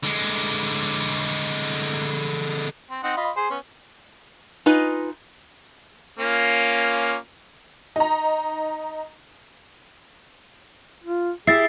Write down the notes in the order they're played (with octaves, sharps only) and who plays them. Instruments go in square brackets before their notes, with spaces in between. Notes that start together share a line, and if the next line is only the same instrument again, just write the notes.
[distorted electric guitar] D3 G#3
[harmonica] C4
C4 D#4 F#5
F4 D#5 B5
G#4 C5 C6
B3 C#4
[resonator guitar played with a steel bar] D#4 F4 B4 D#5 G#5
[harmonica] A#3 C#4 F4
[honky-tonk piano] D#4 A#5
[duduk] F4
[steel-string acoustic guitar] E4 G4 [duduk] G#4 [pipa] E5 [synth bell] A6 C7